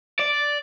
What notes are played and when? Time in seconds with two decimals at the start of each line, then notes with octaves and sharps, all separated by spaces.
0.20 D5